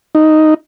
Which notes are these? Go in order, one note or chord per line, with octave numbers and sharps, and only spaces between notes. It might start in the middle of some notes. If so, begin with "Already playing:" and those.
D#4